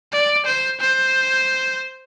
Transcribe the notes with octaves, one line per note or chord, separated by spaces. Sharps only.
D5
C5
C5